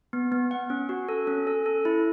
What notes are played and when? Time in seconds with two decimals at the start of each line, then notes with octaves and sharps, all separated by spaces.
0.13 B3
0.32 B3
0.51 F#5
0.70 C#4
0.89 F#4
1.09 A4
1.27 C#4
1.47 A4
1.66 A4
1.85 E4